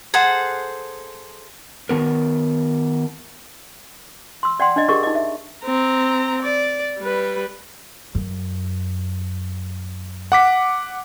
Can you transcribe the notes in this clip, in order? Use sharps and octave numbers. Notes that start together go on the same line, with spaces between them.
G#4 A4 C5 F#5
D#3 B3 A#4
C6 E6
D5 F#5 G5 C6
D4 D5 D#5
G4 G#4 A#4 D#5 C#6
D#4 D#5
E5
C4 A#5
D5
G3 B4
F#2
F#5 D6 B6